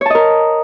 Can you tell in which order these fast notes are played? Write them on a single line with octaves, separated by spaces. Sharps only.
C#5 A5 D#5 A#4